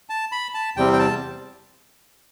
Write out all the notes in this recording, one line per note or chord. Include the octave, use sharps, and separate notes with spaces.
A5
B5
A5
E2 C3 G3 C4 G5
G5
A5